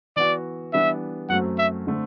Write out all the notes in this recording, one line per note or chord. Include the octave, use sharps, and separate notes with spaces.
E3 B3 F#4 D5
E3 G3 B3 D4 E5
F#2 F#3 A3 C4 F#5
E5
D3 A3 C4